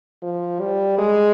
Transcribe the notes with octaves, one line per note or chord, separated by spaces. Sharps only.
F3
G3
G#3